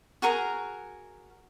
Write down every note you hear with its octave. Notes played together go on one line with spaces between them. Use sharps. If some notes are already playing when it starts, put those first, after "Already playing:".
F#4 G#4 A#4 A#5